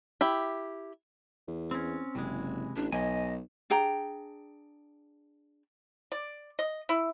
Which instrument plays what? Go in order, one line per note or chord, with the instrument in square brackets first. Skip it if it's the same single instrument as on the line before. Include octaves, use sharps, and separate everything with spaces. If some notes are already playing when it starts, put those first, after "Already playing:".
[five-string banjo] E4 G4
[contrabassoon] E2
[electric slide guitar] C4 C#4
[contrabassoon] F#1 [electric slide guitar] C3 E3 G#3
[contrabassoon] A1 [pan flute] D4
[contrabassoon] B1 [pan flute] D#5 [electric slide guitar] G#5
[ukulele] D4 G#4 G5 A#5
[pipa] D5
D#5
E4